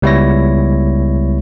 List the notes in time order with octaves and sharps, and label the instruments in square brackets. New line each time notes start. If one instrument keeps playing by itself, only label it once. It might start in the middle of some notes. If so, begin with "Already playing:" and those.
[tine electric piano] C#2 G3 B3 E4 C#5 A#6